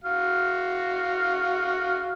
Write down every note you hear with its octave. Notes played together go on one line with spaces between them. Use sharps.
F#4 F5